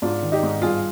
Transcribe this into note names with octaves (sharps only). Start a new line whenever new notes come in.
G#2 D4 F4
D#3
D#4 G4
G#2
G2 F4 G#4